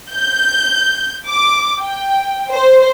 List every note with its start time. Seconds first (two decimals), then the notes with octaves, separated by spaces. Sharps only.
0.12 G6
1.27 D6
1.81 G5
2.52 C5